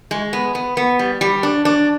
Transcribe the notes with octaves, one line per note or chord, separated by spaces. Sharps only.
G#3
B3
B3
B3
G3
G3
D4
D4